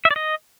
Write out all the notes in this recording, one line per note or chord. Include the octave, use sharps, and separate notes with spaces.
E5
D5
D#5